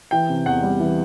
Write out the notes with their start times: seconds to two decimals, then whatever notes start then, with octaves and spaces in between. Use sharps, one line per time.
0.11 E3 G5
0.29 C3
0.46 E2 F#5
0.63 G3
0.80 E3